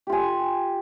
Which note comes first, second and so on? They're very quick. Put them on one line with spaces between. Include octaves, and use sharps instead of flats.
G4 F4 G#5